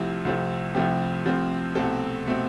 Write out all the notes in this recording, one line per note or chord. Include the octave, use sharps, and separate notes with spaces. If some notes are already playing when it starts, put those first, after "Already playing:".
Already playing: C2 C3 F3 A3 C4 E4
C2 C3 F3 A3 C4
C2 C3 F3 A3 C4 G4
C2 C3 F3 A3 C4
C2 B2 A3 C4 A4
B2 A3 C4